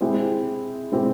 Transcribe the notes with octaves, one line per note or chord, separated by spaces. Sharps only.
G#3 C4 E4 G4
G#3 C4 E4 G4